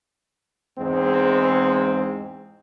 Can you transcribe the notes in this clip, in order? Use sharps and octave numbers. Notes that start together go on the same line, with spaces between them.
E2 G#2 G#3 C4